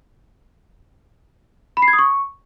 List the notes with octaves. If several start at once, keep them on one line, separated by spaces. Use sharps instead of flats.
B5
C7
G#6
D#6
C#6